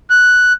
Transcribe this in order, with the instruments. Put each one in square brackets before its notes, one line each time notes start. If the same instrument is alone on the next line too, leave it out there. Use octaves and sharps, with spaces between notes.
[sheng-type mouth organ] F#6